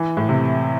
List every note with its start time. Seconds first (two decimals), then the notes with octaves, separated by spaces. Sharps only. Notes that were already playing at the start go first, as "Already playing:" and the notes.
Already playing: E3
0.17 A2
0.29 C3